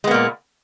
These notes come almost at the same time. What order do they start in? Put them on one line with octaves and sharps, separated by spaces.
G#3 B3 A#3 A#2